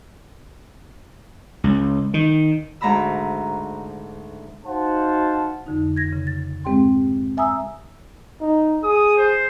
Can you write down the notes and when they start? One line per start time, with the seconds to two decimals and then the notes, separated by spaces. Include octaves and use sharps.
1.64 C#2
2.14 D#3
2.81 D2 G#2 A#5 B5 E6
4.65 D#4 F#4 C5 F5 F#5 A5
5.66 F2 D3 D#4
5.96 G#6 A#6
6.13 C#3
6.27 A6
6.65 G#2 G#3 C4 G4 G5 C6
7.37 E5 G#5 A#5 D#6 E6
8.41 D#4
8.84 G#4 D#6
9.17 C5